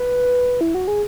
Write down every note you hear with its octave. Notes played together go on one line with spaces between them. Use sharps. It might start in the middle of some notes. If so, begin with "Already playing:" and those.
Already playing: B4
E4
F#4
G#4